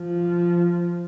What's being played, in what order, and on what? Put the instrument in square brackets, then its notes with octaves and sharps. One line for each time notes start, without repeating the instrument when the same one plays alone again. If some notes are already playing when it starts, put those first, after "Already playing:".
Already playing: [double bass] F3